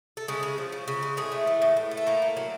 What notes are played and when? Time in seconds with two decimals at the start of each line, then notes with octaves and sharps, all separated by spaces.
0.17 A4
0.28 C#3 G#3 G#4
0.43 G#3
0.58 F3
0.72 C#3
0.87 C#3
1.03 G#3
1.17 A2 G#3 G#4
1.32 A3
1.47 E3
1.62 A2
1.77 A2
1.91 A3
1.97 A4
2.06 A2 A#3 A#4
2.22 A3
2.37 F#3